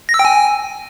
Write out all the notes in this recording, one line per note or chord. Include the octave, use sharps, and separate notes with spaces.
A#6
E6
G5
G#5